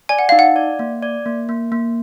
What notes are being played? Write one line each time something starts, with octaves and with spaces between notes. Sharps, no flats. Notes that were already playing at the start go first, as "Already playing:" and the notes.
D5 G#5
F#5
D#4 F5
F#5
D5
A#3
D5
A#3
A#3
A#3